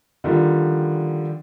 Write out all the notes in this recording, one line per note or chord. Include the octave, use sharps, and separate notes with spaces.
D3 D#3 F3 G3